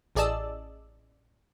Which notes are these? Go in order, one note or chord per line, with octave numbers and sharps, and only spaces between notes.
A1 G#4 D5 D#5 A5 E6